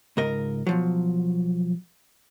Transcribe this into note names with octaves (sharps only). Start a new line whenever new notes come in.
C#2 G#2 A#4 D#5
B2 F3 F#3